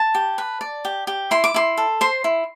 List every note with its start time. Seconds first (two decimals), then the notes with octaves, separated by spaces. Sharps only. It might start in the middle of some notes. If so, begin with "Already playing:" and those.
Already playing: A5
0.15 G4
0.38 B4
0.61 D5
0.85 G4
1.07 G4
1.31 E4 C6
1.44 D6
1.54 E4 C6
1.77 A4
2.01 C5 C6
2.24 E4